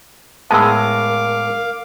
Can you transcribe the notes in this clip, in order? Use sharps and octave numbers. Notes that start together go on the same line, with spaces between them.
A2 G#3 B3 A#4 F5 A5 D6 E6